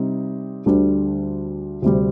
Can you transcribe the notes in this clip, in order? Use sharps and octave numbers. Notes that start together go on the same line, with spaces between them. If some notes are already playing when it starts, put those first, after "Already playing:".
Already playing: C3 G3 C4 D#4
D2 D3 G3 D4
D2 C3 G3 C4